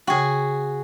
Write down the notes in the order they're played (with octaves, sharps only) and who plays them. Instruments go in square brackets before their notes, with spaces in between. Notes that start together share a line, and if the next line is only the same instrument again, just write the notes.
[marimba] C#3 G5 [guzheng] F#4 G#4